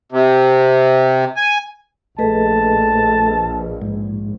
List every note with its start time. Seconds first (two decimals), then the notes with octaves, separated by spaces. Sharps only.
0.12 C3
1.37 G#5
2.19 A#1 A3 G#4 B4 D#5 A5
3.82 G#2